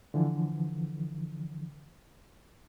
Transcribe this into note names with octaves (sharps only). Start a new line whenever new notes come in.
D3 E3 F3